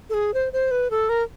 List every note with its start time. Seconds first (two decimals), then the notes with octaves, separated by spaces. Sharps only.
0.10 A4
0.14 G#4
0.34 C5
0.53 C5
0.71 B4
0.91 A4
1.09 A#4